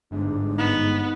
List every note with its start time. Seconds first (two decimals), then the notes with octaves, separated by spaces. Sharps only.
0.11 G1 G#2 D4
0.58 B3 D#4